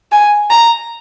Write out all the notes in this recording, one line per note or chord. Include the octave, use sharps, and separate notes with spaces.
G#5
A#5